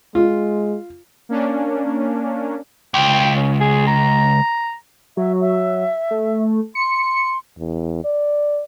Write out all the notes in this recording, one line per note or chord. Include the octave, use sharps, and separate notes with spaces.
G#3 F4
A#3 C#4 D4
C#2 G5
C#4
G#4
A#5
F#3 E5
E5
A3
C6 C#7
E2
D5